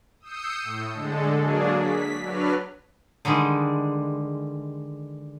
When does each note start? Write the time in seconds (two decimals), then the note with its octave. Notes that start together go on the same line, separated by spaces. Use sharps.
0.20 D#6 E6 G6 C7 C#7
0.63 A2
0.93 D3 G#3 A4
1.32 F#3 A#3 D4 G#4
1.76 B6
2.21 F#3 D4 B4 F6
3.25 D3 D#3 G3 G#3